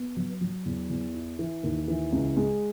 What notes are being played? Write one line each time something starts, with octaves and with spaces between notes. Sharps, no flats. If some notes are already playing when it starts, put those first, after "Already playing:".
Already playing: B3
F#3
F#3
E2
E2
E4
E3
D#2
E3
C#2
G#3